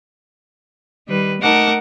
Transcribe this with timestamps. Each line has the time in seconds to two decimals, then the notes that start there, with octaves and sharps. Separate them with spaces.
1.08 D#3 G3 B4
1.41 A3 D#4 A#4 F#5 A5 D6